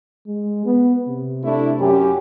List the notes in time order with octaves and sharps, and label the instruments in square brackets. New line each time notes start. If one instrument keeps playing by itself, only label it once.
[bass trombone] G#3
B3
C3
[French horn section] A3 D4 E4
F#2 C#4 G4